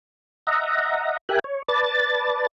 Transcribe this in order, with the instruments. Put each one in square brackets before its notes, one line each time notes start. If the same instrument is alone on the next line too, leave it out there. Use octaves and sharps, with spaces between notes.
[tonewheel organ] D#5 E5 F#5 A#5
G4 A#4 E5 G5 G#5 F#6
C#5
B4 D5 A5 A6